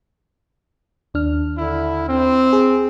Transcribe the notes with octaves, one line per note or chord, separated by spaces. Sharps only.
D#2 D4 F6
D3 E4
C4
G#4